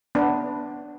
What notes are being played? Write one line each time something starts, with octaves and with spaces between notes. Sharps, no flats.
B3 D4